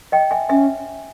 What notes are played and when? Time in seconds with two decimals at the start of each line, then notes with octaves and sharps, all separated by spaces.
0.12 D#5 G5
0.31 E5 G#5
0.49 C#4 E5 G#5